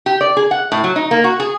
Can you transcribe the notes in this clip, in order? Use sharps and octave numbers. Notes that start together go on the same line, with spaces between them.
G4
D5
G#4
F#5
A2
F#3
D#4
A#3
F#4
G#4